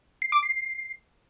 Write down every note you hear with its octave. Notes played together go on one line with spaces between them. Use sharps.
C7
D6
C7